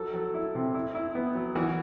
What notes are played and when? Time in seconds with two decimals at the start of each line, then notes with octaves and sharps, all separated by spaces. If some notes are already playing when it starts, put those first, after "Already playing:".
Already playing: F#3 A4
0.14 F#3
0.34 E4
0.55 C3
0.74 E4
0.95 E4
1.15 B3
1.35 F#3
1.55 E3 F#4